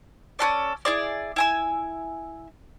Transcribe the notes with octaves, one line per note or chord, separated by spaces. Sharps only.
C#4 F#4 A4 D5
E4 G#4 D5
E4 G#5 E6